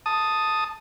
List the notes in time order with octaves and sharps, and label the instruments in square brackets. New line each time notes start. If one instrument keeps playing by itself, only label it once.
[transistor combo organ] A5 D#6